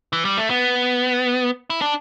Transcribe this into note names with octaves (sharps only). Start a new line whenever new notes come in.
E3
G3
A3
B3
E4
D4